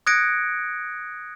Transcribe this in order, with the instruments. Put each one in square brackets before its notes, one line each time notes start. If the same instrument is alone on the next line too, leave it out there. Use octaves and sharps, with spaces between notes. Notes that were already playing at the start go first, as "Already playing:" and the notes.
[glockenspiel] D#6 F#6 G#6 A#6 C#7 D7